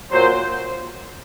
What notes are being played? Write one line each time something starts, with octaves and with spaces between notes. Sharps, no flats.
A#2 F#3 C5